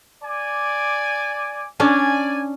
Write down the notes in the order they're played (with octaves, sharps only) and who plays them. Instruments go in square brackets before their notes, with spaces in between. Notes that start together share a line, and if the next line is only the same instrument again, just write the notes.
[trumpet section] D5 G#5 D6
[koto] C#4 D4 [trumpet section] D5 G#5